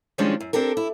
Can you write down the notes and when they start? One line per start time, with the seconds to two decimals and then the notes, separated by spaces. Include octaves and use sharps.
0.18 D#3 F3 G3 G#3 C#4 D4
0.40 F#2
0.53 C4 D4 G4 A4 A#4
0.77 E4